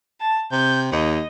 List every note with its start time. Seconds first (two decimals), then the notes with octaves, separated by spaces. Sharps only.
0.20 A5
0.52 C3 G6
0.92 D#2 D#5